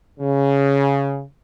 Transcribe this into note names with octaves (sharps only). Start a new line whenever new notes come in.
C#3